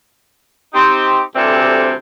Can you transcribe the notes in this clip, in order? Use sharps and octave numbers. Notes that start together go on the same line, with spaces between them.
C4 D#4 G4
D2 C3 E3 G3 C4 A4